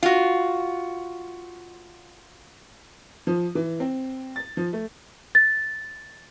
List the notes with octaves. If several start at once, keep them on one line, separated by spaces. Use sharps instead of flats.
F4 F#4
F3
E3
C4
A6
F3
A3
A6